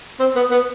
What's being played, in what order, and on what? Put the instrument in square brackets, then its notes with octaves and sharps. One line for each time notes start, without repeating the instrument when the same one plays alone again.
[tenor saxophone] C4
B3
B3